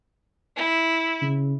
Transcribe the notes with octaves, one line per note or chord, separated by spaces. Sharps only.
E4
C#3